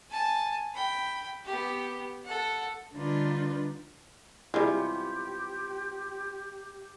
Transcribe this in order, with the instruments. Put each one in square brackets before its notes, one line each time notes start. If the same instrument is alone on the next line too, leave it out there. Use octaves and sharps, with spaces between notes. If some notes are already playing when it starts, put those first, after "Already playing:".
[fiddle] G#5 A5
G5 B5
B3 G4
A4 F#5
[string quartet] D3 G3 D4 D#4 F4 B4
[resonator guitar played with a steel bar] C3 B3 F4 [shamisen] G3 G#3 [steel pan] E4 [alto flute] G4